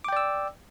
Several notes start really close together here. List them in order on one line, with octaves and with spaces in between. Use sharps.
D6 G5 D5 E6